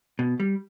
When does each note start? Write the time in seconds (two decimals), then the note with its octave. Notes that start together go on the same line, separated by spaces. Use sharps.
0.19 B2
0.40 G3